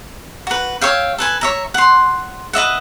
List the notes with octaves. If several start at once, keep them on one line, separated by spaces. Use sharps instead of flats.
F#4 B4
C#5 E5 F5 G5
A4 B4 G#5
C#5 E5 A#5
F#5 C6
B4 D#5 E5 F#5